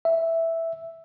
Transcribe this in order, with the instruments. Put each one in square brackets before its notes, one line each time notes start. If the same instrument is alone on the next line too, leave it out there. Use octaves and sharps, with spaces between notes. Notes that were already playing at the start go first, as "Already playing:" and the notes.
[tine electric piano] E5